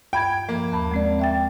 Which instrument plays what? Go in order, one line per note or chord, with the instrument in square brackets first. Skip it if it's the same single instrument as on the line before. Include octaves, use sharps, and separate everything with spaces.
[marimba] G2 B5 G#6 [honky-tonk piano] G5
[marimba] F3 [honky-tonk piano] A#3
[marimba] D#2 A5 B5
G#3 C4 D5
E5 G5 A6